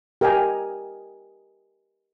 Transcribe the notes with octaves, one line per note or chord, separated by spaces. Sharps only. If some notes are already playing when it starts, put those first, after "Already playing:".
G4 A#4 D#5 G5 G#5